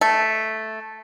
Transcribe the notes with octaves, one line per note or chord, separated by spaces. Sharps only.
A3